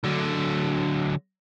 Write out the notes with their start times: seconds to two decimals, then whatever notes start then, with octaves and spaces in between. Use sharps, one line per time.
0.04 D3 F#3